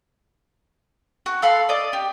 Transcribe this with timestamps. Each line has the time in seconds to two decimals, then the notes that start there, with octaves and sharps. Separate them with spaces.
1.26 F#4
1.42 A4 F5 B5 C6
1.69 D5 D#5
1.93 G4